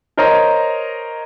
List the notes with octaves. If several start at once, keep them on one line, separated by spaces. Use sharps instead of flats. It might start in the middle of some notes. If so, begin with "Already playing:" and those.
A#4 C5 C#5 D#5 A#5